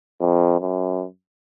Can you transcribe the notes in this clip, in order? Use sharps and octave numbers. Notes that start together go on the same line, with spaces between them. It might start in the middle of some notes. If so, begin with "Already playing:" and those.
F2
F#2